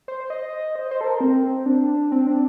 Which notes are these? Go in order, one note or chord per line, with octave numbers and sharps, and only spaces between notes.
C5
D#5
C5
C5
A4
A#4
C4
D4
C4
D4